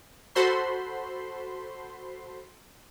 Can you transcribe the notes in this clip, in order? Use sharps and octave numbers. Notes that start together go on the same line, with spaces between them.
F#4 A4 C5 B5 C6